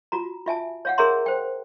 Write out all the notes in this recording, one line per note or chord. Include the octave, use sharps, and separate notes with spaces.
F4 F#4 A#5
F4 E5 G#5 A5
C#5 F5 F#5
G#4 A#4 C#5 E5 A#5 C6
C5 G5